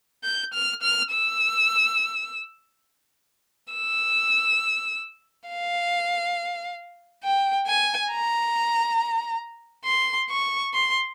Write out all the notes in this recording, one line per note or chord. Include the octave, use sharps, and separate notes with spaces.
G6
F6
F6
E6
E6
F5
G5
G#5
A#5
C6
C#6
C6